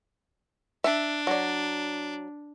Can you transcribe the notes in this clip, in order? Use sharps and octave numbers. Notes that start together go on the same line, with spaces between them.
D4 E5
F#3 D5